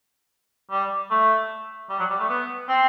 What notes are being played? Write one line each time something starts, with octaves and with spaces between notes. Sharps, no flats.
G3
A3
G3
F#3
G3
A3
B3
C4